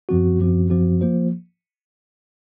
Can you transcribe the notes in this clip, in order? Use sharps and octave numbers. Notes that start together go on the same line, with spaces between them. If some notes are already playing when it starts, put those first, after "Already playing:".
F#2 F3 C4 F#4
F#2 F3 C4 F#4
F#2 F3 C4 F#4
F3 A#3 F4 C5